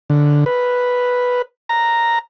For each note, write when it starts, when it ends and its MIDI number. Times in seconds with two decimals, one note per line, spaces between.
0.10 0.44 50
0.46 1.42 71
1.69 2.19 82